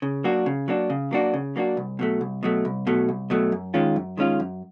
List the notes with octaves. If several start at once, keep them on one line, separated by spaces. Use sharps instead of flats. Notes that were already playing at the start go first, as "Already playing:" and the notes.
C#3
F#3 A#3 D4 F#4
C#3
F#3 A#3 D4 F#4
C#3
F#3 A#3 D4 F#4
C#3
F#3 A#3 D4 F#4
C2
B2 F#3 A3
C2
B2 F#3 A3
C2
B2 F#3 A3
C2
B2 F#3 A3
F#2
D#3 G#3 C#4 F4
F#2
D#3 G#3 C#4 F4
F#2